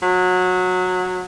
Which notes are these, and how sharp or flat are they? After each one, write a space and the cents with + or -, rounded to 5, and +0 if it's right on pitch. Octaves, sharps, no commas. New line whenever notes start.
F#3 -20